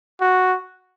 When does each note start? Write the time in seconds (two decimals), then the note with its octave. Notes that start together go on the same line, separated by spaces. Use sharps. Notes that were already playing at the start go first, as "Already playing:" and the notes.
0.21 F#4